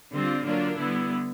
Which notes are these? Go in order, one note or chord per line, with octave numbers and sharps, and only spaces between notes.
D3 G3 C4 F4
D3 F#3 A#3 D4 F4
D3 G3 B3 E4